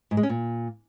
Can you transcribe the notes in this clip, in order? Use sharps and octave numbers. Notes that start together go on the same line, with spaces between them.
G#2
G#3
C#4
A#2